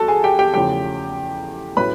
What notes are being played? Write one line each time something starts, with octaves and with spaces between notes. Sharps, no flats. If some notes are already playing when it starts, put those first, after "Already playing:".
Already playing: G2 F#4 A4 A5
G#4 G#5
G4 G5
G4 G5
E2 C#3 F3 A3 G4 G5
A2 F#3 A3 C#4 B4 B5